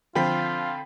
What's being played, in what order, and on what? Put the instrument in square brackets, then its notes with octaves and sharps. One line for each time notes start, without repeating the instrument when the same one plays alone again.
[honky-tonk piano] D3 F3 C4 [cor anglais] F4 [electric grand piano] G5 B5 B6